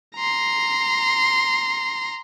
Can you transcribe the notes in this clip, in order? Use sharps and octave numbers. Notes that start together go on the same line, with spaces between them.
A#5 C6